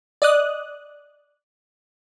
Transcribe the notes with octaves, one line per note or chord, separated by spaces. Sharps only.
D5 D#5 D#6 F#6